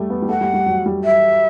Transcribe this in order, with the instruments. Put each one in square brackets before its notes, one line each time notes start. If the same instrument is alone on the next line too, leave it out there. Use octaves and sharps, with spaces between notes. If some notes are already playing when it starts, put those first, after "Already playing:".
Already playing: [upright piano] G3 A3
B3
G3
[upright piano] A3 [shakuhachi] F#5
[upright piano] G3
G3
F#3
G3
[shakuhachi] E5